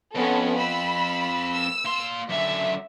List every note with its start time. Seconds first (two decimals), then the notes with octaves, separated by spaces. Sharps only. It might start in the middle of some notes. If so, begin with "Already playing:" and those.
0.15 F2 B3 C#4 A4
0.57 B5 E6
1.51 E6
1.85 A#3 C6
2.29 F#2 D3 E5